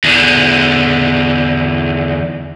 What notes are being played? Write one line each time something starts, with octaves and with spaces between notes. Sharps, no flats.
E2 D3